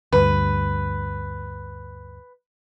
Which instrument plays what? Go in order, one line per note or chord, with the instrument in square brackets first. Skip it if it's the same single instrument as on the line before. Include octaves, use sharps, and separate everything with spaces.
[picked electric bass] D2 G2 [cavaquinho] B4